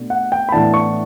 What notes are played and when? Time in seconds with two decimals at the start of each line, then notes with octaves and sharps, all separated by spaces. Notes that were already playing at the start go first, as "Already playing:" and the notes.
Already playing: B2 A3 D4
0.10 F#5
0.32 G5
0.49 B5
0.52 A2 E3 B3 D4 A5
0.74 C#6